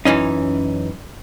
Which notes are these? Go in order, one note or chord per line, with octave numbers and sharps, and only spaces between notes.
F#2 E3 C#4 D#4